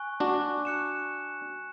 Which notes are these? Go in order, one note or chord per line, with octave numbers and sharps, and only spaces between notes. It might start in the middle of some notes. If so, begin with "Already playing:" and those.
Already playing: G#5 C#6 F#6
D4 F#4
F#6 C#7 E7